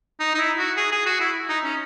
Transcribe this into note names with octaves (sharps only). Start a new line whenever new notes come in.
D#4
D#4
E4
F#4
G#4
G#4
F#4
E4
D#4
C#4